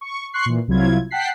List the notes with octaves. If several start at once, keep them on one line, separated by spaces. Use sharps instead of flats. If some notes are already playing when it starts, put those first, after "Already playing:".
C#6
C6 C#6 F#6 C7
A#2 E3
C2 C3 F#3 E4 F4 G#6
F#5 G5 A5 F#6 B6 C7